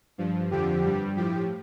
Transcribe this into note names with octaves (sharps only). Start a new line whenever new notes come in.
G2 F3
F2 D3 F3 G4
G2 G3
A2 F3 G4